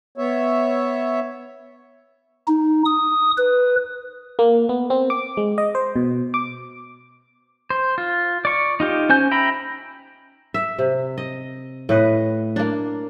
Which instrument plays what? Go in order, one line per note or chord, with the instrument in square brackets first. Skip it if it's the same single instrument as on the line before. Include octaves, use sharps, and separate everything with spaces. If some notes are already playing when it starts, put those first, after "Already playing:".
[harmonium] B3 C#5 E5
[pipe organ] D#4
D#6
B4
[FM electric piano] A#3
B3
C4
D6
G#3
D#5
C5
B2
D6
[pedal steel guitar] C5
F4
D5 C#6
D#4 F4 G4
C#4 C5 G#5 G6
E5 G5 A#5 B5
[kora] E5
C3
D#5
A2 B4 D#5
A#3 D4